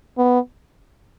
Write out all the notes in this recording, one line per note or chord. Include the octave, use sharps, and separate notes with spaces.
B3